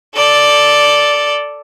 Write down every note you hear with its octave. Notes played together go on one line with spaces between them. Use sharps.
A4 D5